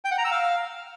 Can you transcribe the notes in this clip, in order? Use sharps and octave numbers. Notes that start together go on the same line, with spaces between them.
G5
F#5
A#5
E6
F5